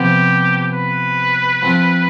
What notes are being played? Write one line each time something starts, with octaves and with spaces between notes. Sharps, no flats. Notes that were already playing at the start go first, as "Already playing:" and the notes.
Already playing: C3 F3 B3 F4 G4
B4
F3 C4 F4